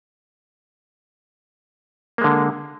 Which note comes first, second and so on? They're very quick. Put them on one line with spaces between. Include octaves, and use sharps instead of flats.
A#3 G#3 D3